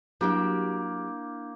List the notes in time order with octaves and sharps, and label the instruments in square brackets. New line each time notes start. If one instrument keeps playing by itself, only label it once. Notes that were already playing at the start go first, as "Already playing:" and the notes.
[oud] F#3 G4 F5 [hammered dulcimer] A#3 [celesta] D4 E4 G6